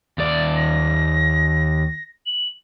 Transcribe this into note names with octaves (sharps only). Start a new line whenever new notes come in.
D#2 D5 A6
A#6
F#7